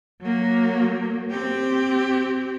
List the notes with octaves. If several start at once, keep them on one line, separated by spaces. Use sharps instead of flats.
F#3 A#3
C4 G4